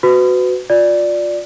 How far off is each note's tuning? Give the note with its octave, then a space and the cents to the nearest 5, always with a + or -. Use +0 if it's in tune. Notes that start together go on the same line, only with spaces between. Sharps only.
F#4 +0 B4 +30
F4 +25 D5 +0